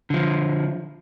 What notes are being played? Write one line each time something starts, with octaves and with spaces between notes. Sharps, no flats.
D3 F3